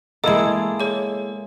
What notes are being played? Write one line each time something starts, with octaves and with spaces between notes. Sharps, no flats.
G#3 A#3 E4 A4 D#5 E6
G#4 C#5